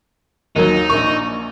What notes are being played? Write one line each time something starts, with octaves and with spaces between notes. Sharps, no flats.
D#2 D#3 F#3 D#4
A#1 C#6